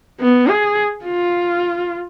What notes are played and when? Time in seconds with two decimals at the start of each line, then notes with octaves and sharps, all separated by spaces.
0.20 B3
0.49 G#4
1.05 F4